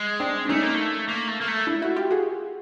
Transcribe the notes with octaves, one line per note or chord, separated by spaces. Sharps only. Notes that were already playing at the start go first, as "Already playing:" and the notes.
Already playing: G#3
C4 D4
D4
A3 C#4 D#4
A#3
A3
A#3
A3
A#3
A3
D4 E4
E4 F#4
F4 G4
F#4 G#4